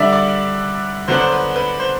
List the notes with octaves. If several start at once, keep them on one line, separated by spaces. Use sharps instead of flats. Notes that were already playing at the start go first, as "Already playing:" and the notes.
Already playing: D3 G3 D4 D5 E5
D5
D3 F#3 B3 D4 C5
C5
B4
B4
C5